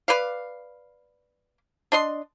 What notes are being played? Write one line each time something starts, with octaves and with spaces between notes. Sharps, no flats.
B4 D5 F5
D4 D#5 C6